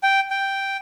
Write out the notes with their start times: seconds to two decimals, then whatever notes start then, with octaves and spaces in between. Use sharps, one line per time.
0.03 G5
0.30 G5